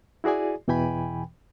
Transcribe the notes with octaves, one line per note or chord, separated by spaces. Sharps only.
E4 F#4 G#4 D5 G#5
E2 B2 E3 G5 G#5 B5